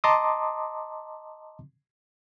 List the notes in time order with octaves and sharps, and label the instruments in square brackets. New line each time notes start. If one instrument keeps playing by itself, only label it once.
[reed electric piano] D#5 A5 A#5 C6 D6 D#6